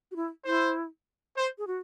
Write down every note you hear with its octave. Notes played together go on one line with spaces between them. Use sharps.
F#4
E4
E4 C5
C5
G#4
F#4